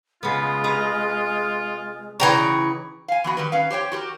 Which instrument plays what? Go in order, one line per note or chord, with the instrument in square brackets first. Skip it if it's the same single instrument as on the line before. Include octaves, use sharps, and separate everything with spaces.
[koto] C#3 B3 [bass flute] G#3 [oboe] F4
[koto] C3 B4 A#5
[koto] C#3 F#3 D#4 [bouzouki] E3 G5 A#5 [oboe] C#6
[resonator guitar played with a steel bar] F5 G#5
E3 B3 F#4
D#3 G3 B4
C#4 B4 F5
G4 C5 C#5 G5
F#4 G4 A#4